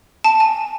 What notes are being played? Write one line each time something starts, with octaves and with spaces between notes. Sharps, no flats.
A5
G#5